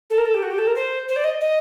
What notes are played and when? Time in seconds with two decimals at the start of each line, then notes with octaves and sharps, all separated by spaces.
0.10 A4
0.18 A#4
0.26 A4
0.34 G4
0.43 F#4
0.51 G4
0.58 A4
0.67 A#4
0.75 C5
1.08 C5
1.16 D5
1.24 D#5
1.41 D#5